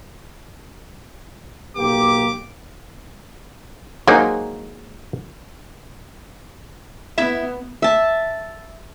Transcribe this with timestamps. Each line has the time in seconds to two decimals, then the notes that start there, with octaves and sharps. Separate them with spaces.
1.77 B1 A#3 G4 D6
4.08 F#3 G#3 A#3 D#4 C5 G#5
7.18 B3 E4 E5
7.82 E5 A5